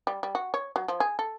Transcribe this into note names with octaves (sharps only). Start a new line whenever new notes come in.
G3
G3
F#4
C#5
F#3
F3
G#4
A4